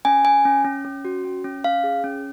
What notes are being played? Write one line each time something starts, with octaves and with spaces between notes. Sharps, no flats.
C#4 G#5
C#4 G#5
C#4
C#4
C#4
F#4
C#4
C#4
C#4 F5
G#4
C#4